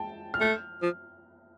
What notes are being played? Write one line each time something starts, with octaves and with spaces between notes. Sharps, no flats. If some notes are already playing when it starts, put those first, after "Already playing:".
Already playing: G5 A5
F6
A3 G6
F3